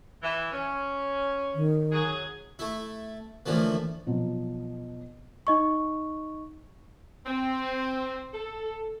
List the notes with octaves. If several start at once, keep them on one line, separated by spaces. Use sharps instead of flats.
E3
C#4
D#3
F#3 G#4
A3 E4
A2 D3 E3 F3 A#3
B2 F3 F#3
D#4 D#5 C#6
C4
A4